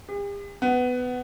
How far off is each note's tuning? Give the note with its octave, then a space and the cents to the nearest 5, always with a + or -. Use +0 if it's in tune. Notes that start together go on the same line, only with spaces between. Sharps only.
G4 +45
B3 +15